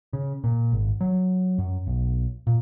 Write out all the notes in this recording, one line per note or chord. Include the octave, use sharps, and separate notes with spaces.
C#3
A#2
G#1
F#3
F#2
B1
A#2